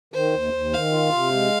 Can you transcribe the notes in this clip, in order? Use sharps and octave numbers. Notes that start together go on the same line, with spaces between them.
D#3 C5
D#2
D#2
D#3 F5
F4
C3
G#3